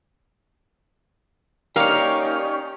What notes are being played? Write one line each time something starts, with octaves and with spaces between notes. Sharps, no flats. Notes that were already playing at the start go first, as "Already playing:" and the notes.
A#3 C#4 D#4 G4 A#4 C#5 D5 F5